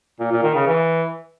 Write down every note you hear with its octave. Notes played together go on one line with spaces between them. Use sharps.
A#2
A#2
D#3
C#3
E3